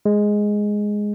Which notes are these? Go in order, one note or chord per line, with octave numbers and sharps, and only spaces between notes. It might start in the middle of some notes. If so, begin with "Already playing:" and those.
G#3